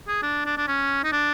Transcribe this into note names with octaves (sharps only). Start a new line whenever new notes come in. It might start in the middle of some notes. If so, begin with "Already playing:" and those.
G#4
D4
D4
D4
C#4
D#4
D4